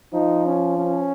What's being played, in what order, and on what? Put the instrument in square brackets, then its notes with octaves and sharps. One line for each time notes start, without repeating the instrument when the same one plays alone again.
[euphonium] F3 [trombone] D#4
[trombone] C#4
C#4